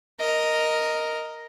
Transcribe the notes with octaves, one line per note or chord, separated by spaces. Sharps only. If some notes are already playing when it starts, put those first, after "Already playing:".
A#4 D#5